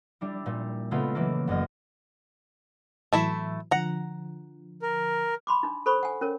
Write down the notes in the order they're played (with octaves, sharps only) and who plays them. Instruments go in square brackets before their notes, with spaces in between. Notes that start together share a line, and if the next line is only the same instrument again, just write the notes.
[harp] G3 D4 E4
A#2 G3
C#3 G#3 A3 B3 F4 G#4
E3 F#3 A3 A#3
F#1 F#2 F#3 D#5 F6
[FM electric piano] A2 E3 F#3 [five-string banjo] A3 E4 E5
[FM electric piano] D3 F3 [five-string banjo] F#5 A#5
[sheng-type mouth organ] A#4
[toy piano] B5 C6 D6
D4 D#4
A4 C5 B5 C#6
F#5 G#5
C#4 A#4 C#5